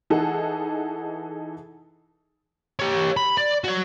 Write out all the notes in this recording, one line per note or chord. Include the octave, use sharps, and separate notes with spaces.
E3 D#4 G#4 A4 F#5
G4 C#5
B5
D5
F#4 C#5